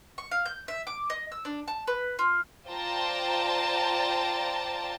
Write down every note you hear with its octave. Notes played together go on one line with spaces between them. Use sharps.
C#6
F5
G6
E5
D6
D#5
E6
D4
A5
B4
F4
F4 C5 D5 G5 A5 A#5